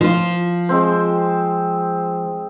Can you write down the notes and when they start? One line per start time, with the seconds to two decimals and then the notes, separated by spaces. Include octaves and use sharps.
0.01 F3 F4
0.69 G#3 C4 C5